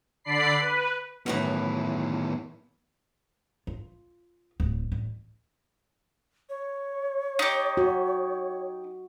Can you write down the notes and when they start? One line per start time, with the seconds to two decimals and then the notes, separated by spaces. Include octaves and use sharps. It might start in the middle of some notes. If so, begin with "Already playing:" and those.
0.24 D3 D5 B5 C7
0.61 B4
1.26 F#2 A2 D#3 E3 B3
3.67 F4
4.60 D1
4.92 A1
6.49 C#5
7.39 D#4 G4
7.77 F#4